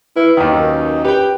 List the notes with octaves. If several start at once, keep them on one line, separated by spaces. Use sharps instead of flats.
E4 B4
D#2 D#3 D#4
F#2 A#4
G4 B4 G5